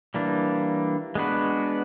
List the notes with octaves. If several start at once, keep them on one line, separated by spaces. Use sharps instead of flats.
E3 G3 A#3 D4
G#3 B3 D4 F#4 B4